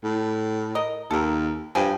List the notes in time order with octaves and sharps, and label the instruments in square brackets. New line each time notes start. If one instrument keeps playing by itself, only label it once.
[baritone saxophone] A2
[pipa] A#4 D#5
[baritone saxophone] D#2 [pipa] A4 A#4
[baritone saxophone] G2 [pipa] F3 G5 G#5